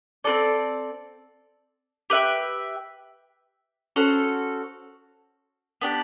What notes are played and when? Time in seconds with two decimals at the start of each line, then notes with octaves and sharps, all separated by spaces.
0.24 C4 F4 A4 D5
2.10 G4 B4 E5 G5
3.96 C#4 F#4 A4 C5
5.81 B3 D4 G4